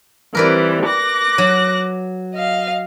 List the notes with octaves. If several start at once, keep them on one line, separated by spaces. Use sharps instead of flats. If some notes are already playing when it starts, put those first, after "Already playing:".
E3 G3 C4 A#4 B4 D5
D6 F#6 A#6
F#3
D#5 F5